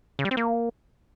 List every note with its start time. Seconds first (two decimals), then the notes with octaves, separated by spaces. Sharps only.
0.19 C#3
0.25 G3
0.31 C4
0.37 A#3